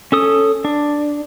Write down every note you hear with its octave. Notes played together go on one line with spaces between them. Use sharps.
C#4 A4 D#6
D4